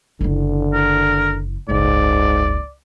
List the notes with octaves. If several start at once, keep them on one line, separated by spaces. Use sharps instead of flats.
F#1 D3 E3
A#4
F#1 C#2 G#2 D5